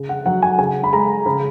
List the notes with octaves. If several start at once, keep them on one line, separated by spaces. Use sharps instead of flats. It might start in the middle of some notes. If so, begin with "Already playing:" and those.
Already playing: C#3
F#5
F#3 F#5
G#5
C#3 G#5
B5
G#3 A#5
C#3 B5